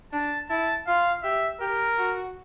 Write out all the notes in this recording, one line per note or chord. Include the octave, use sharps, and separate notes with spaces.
D4 A5
E4 A5
F4 F5
G4 E5
G4 A#4
F#4